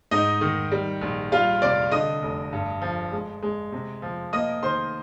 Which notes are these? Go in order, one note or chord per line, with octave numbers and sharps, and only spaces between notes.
G#2 D#4 D#5
D#3
G3
A#1
G3 F4 F5
C3 D5 D6
D3 D#5 D#6
F1
G2
F3
G#3
G#3
C3
F3
A#3 D#5 D#6
D#3 C5 C6